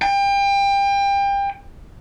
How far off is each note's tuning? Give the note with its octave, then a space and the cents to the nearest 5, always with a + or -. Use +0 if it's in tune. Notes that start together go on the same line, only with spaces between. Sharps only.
G5 +30